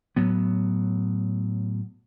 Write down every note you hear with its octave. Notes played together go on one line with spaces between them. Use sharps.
A2 F#3 B3